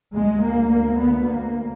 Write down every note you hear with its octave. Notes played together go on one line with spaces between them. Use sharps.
D2 G#3
A#3
A#3
B3
A#3